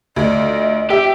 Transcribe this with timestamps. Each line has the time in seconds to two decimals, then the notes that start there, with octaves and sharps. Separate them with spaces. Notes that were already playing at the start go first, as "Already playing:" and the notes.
0.16 D2 F4 D5 D#5
0.90 G4 E5